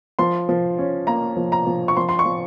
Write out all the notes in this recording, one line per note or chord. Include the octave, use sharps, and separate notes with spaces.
F3 C6
F3
C#4
A#3 A#5
F3
A#5
F3
C#6
F3 C6
C6
C#6
F3